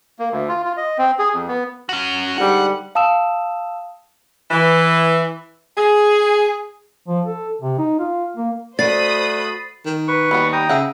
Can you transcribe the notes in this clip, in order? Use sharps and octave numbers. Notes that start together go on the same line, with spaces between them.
A#3
D2
F4
F4
D#5
C4
G#4
F2
B3
C#4 F#4
G#2 D3 G3 F#5
F5 A5 D#6 E6 E7
E3
G#4
F3
A4
C3
D#4
F4
A#3
A3 F#4 C5 D5 B5 D#6 A6 C7
D#3
B4 C#6
D#2 G3 B3 F#4
G5 A#5 D#6
C#3 E5 F#5